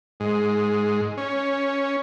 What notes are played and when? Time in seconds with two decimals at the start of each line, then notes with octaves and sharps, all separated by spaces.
0.20 G#2
1.17 C#4